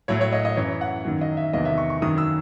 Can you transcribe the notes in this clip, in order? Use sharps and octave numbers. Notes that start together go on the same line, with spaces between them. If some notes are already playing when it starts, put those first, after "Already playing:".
A2 F#3 C#5
C#5
D#5
D#5
F#2 E3 C#5
F#5
F#2 D#3 F#3
D#5
E5
E2 C3 D#3 F#3 D#5
E5
C#6
C#6
F#2 D#3 F#3 D#6
E6